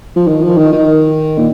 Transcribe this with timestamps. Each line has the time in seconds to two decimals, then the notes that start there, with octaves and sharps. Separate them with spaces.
0.16 F3
0.27 D#3
0.43 F3
0.57 D#3
0.72 D#3
1.38 A#2